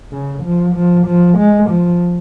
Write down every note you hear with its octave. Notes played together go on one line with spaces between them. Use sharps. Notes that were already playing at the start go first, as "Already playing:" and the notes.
C#3
F3
F3
F3
G#3
F3